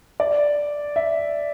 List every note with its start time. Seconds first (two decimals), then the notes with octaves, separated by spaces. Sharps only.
0.20 D5
0.96 E5